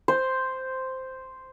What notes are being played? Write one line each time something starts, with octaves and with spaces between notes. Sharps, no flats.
C5